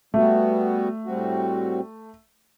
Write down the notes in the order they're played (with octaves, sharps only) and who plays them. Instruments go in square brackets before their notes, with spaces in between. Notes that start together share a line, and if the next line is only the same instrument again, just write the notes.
[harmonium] G3 B3 F#4 [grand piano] A3
[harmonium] A2 G3 C4 F#4